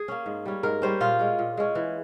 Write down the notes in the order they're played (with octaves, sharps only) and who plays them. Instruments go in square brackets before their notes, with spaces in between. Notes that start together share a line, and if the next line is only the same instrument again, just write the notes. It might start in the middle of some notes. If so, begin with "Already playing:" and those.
Already playing: [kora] G#4
A#3 C#4
G#2
G3 C#4
G#2 A#4
G3 C#4 C5
A#2 F4
G#3 C#4
A#2
G#3 C#4
E3